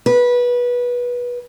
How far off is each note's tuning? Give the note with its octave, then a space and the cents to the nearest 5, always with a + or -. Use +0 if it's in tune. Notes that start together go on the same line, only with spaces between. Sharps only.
B4 -20